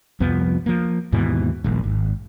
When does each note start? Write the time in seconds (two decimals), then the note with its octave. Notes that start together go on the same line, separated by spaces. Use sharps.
0.20 C2 F2 F3 B3
0.66 F3 A#3
1.13 D#2 G#2 B2 E3
1.64 D#1 A#1
1.84 G#1